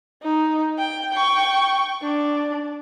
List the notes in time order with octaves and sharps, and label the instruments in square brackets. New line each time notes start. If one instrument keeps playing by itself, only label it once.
[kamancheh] D#4
G5
G5 C#6
D4